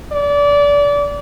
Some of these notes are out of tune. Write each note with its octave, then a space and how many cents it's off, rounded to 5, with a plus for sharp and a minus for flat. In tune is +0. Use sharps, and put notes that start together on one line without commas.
D5 -25